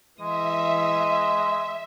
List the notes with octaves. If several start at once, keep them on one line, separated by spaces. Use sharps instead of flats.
E3 G#3 D#5 E5